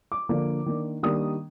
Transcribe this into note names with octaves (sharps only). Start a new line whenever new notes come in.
D6
D3 F3 A#3 D4
D#3 A#3 D4
D#3 G3 A#3 D4 D#6